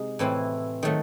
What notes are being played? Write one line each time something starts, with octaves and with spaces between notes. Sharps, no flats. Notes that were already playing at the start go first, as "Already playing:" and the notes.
Already playing: C3 G#3 D#4
A2 E3 C4 E4
D#3 F#3 A3